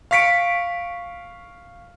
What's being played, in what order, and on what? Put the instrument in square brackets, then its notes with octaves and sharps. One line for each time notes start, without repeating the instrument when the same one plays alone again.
[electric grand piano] F5 C#6 B6 C#7 D7